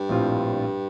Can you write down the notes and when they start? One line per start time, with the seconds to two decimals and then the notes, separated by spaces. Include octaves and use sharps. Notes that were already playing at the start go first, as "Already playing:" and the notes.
Already playing: G2
0.09 A#1 A2 G3 C4 F4